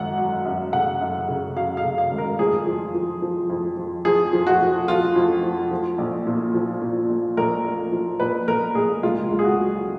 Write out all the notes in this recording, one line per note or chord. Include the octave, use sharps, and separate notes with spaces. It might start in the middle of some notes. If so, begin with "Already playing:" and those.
Already playing: G#1 F#2 F#5
F#3
F#2
C#3 F#5
F#2
C#3
F#3 F5
F5
C#3
F5
G#1
A#4
F2 G#4
F3
F3
F3
F2
F3
F2 G#4
F3
F#4
F3
F3 F4
F2
F3
F3
A#1
A#2
F3
A#2
A#1
A#1 A#4
A#1
F3
A#1 B4
A#1 A#4
A#1 G#4
C#2 F4
C#2
G#4
F#4
F#3